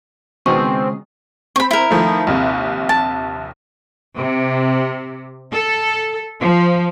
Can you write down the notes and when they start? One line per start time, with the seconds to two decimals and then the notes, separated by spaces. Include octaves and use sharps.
0.46 C#2 B2 D#3 B3 C4 G#4 D#5 C#6
1.56 C4 B5 C#6
1.71 E4 A#4
1.91 D#3 F3 A3
2.27 A#1 D#2 C3
2.89 A5
4.16 C3
5.52 A4
6.39 F3